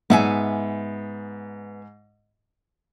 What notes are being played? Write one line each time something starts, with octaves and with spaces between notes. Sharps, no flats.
G#2 B3 E5 G#5